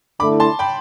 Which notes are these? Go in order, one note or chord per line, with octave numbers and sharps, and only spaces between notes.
D3 A3 E4 B5 D6
A5 C6
G5 B5